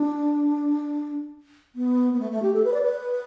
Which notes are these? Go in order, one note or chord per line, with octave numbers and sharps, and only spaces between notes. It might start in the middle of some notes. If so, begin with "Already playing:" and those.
Already playing: D4
B3
B3
A3
A3
G4
A4
B4
D5
B4